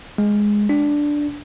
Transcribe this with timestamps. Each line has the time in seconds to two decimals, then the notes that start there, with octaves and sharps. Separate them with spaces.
0.18 G#3
0.69 D4